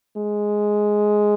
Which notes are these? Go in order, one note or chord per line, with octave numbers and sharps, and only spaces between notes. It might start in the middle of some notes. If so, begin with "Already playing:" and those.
G#3